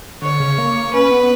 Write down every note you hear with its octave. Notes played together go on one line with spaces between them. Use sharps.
D3 C#5
C#3
A#3
C#4 B4
B3